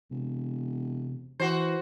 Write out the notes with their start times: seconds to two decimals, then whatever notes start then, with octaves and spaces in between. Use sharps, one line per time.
0.11 E1 C3
1.40 E3 F#4 C5